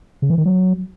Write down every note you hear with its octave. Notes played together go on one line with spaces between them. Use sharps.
C#3
E3
D#3
F#3